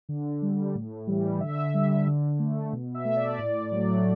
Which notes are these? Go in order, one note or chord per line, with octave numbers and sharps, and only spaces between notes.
D3
G3
A2
E3 G3
D3 E5
G3
D3
A3
B2
E5
A3
D5
A2
F#3 A3